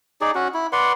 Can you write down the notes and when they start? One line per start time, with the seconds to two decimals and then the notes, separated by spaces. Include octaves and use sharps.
0.21 D#4 G#4 D5
0.35 C#4 F#4
0.54 E4
0.73 B4 D5 F#5 C6